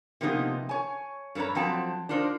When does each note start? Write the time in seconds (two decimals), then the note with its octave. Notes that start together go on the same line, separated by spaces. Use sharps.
0.21 C3 F3 A#3 B3 D#4 G4
0.69 C#5 G#5
1.35 G2 A4 B4 C#5 A#5
1.55 F3 F#3 C4 G5 A5
2.09 D4 D#4 F4 A#4 C5